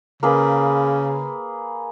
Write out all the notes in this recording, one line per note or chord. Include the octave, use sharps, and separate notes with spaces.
C#3 A#3 G#4 B4